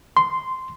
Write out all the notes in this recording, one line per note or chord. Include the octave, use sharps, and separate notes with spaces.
C6